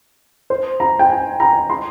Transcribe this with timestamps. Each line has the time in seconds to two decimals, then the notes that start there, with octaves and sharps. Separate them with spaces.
0.50 C5
0.80 A#5
0.99 G5
1.10 G#5
1.40 A#5
1.70 C6